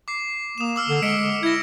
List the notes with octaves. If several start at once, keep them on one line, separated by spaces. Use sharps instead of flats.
D6 C7
A#3 D#6 E7
D6 E6 F6
D3
G#3 B6 C#7 D7
E4 G#6 A#6